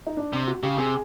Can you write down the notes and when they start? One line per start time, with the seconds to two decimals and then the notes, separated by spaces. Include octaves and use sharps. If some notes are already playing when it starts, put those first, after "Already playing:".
0.07 D#4
0.17 D4
0.33 C3
0.48 F#4
0.63 C#3 G4
0.78 C3 G#4